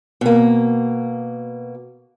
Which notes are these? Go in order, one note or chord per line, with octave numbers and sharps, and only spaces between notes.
B2 A#3